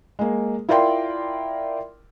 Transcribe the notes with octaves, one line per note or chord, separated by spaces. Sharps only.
G#3 A#3
E4 F4 A#4 D5 G5 C6